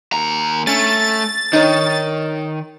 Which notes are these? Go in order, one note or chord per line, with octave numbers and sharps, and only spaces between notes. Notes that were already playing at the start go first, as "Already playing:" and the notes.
D#2 A#5
A3 C#4 A6
D#3 D#4 C#5